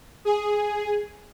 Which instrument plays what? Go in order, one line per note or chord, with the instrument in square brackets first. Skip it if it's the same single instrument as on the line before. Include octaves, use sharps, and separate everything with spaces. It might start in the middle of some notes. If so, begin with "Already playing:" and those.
[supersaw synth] G#4